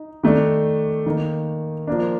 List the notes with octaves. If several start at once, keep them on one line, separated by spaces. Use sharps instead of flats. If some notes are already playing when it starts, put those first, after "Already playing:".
Already playing: D#4
D#3 A3 D4
D#3 A#3 D#4
F3 A#3 D4